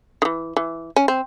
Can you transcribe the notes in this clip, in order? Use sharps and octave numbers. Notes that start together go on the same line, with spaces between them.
D#3
E3
E3
C#4
C4